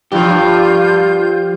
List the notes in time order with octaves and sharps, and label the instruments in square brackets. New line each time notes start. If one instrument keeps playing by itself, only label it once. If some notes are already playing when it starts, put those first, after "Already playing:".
[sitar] G2 [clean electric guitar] F3 G4 [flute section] F4 G6